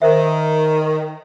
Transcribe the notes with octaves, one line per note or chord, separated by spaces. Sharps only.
D#3 A#4 C5 E5